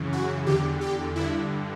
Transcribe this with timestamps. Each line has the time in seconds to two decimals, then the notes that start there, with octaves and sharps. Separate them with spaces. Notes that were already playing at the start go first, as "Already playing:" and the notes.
Already playing: F#2 C#3 E3
0.13 F#4
0.46 E2 D3 G4
0.81 G4
1.16 G2 D3 E4